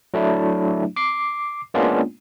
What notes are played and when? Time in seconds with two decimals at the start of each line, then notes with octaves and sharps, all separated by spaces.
0.14 F#3 A3 D4 E4
0.96 D6 C7
1.74 G#3 A#3 B3 C#4 D4 F4